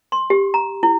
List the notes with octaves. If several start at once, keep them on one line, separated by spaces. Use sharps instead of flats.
C6
G4
A#5
E4